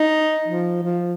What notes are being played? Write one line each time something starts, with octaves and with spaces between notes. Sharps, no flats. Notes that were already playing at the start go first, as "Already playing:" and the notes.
Already playing: D#4
F3
F3